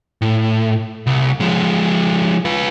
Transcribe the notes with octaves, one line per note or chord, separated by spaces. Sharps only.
A2
C2
F3 G#3
F4 B4